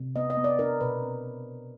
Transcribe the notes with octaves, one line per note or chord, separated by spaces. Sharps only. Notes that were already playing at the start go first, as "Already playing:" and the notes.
Already playing: C3
B3 D#5
D#5
B3
D5
D4 A#4
B2 B4
C4